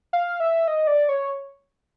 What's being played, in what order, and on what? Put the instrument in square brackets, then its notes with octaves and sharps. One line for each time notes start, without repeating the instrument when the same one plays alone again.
[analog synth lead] F5
E5
D#5
D5
C#5